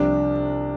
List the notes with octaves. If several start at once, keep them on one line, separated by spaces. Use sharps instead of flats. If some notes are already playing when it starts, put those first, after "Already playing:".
Already playing: C2 C3 F3 D4